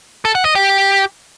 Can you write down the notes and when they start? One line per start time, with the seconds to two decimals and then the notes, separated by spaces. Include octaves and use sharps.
0.25 A4
0.35 F#5
0.45 D#5
0.55 G4